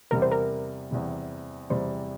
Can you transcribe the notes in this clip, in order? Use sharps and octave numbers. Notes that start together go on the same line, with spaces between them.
E2 C3 G3 A#4
C5
A#4
E2 C3 G3
E2 C3 G3 C5